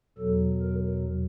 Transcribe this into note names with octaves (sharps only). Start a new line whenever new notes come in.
E2 B2 F#3 A4
A#4